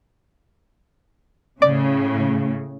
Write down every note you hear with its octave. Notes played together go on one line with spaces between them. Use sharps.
A2 C#3 D5